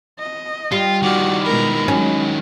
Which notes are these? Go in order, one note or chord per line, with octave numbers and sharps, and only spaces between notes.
D#5
G3 F4
D#3 F3 F#4 D5
B2 G#3 A#4 B5
F#3 G#3 C#4